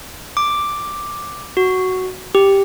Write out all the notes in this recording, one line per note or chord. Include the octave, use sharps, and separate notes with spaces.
D6
F#4
G4